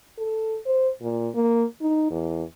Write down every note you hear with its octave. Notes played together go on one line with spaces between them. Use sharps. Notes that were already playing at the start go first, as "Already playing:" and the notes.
A4
C5
A#2
A#3
D#4
E2